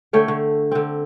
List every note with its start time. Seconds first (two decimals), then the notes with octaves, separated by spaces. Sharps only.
0.13 D3 A3 C#5 G5
0.28 D3
0.71 D3 C4